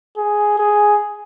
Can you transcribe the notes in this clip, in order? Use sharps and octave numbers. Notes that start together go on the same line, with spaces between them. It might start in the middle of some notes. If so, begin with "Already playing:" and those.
G#4
G#4